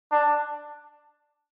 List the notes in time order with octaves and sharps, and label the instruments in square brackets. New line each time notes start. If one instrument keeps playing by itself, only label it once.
[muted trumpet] D4